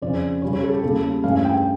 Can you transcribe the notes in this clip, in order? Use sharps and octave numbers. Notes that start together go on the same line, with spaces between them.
F2 C#3 F3 C#4 D5
C#3 G3 C#4 C#5
C#5
A4
G4
E2 C#3 G3 A#3 A4
G2 E3 A3 C#4 F5
G5